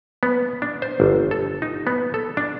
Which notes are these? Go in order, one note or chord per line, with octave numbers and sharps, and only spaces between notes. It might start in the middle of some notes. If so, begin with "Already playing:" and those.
B3
D4
C5
G1
A4
D#4
B3
A4
D4